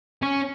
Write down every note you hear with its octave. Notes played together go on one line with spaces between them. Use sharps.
C#4